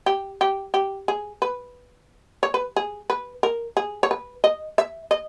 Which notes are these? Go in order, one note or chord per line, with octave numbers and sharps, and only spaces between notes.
G4
G4
G4
G#4
B4
C#5
B4
G#4
B4
A#4
G#4
C#5
B4
D#5
E5
D#5